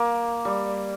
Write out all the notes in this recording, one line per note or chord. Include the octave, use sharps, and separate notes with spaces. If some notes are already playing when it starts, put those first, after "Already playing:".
Already playing: A#3
G3